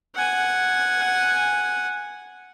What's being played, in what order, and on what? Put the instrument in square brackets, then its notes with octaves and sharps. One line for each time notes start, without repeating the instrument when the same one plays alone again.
[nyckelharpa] F#5 G#5